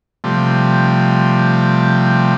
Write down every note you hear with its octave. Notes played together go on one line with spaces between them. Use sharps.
C3 F3 G3 A3